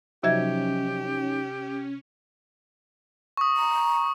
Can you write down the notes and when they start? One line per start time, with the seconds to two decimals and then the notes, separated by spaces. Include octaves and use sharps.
0.23 C3 F3 F#3 C#4 D#4 G4 E5 G#6
3.37 C#6 D#6
3.57 A#5